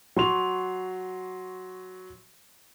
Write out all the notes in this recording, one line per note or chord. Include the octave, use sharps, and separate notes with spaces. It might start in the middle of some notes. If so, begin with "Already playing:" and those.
F#3 C6 F7